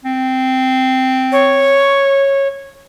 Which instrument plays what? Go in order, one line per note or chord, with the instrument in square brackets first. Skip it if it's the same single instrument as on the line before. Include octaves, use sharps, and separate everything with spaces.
[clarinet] C4
[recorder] C#5